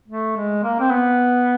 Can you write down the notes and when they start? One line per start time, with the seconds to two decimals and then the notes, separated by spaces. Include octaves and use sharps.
0.08 A3
0.37 G#3
0.63 A#3
0.80 C4
0.91 B3